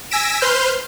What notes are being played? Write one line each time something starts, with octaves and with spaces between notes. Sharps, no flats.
G#5 E6 A#6 B6 D7 E7
B4 C5 C6 F6 G6